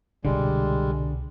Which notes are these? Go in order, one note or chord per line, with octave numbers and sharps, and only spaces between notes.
C2 B2 D3 G3 G#3